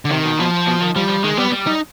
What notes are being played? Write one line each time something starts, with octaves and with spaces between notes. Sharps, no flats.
D3
C3 D#3
B2
B2 F3
B2
D#3
F3 G3
F3
D#3 G#3
G3 B3
G3
D#4